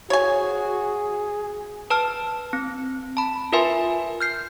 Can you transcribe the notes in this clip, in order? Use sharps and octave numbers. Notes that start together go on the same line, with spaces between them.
F#4 G#4 C#5 G#5
B4 A5 E6 F6
C4
A5 B5
F4 A#4 B4 E5 G#5 C6
F6 G6 C7